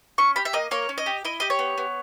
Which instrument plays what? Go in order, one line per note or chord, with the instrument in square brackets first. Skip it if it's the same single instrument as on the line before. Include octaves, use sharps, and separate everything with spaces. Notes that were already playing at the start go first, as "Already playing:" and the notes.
[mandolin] C#4 C#6
G4 B5
E5
A#3 D#5
A#3 C#5
C#4
D#5
G4
E4 D#5
G4 D#5
C#5
B3
B3